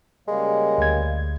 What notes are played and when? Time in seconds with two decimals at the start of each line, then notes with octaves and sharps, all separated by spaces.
0.28 C#3 G3 G#3 A#3
0.78 D2 G#6